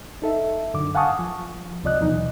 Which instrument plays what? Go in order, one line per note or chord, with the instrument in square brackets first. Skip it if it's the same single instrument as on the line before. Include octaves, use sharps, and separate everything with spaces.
[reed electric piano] D#4 A4 E5
F#2 D3 D6
F5 F#5 G#5 A5 C#6 D#6
F3
C#2 C3 F3 D5 D#5 F#6
D#2 B2 E3 F#3 D#4